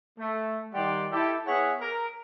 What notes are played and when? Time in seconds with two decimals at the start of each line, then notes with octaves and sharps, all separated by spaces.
0.19 A3
0.72 D#3 G3 G4 D5 F#5 C6
1.11 E4 G4 A4
1.46 B3 G#4 C#5 E5 F#5
1.79 A#4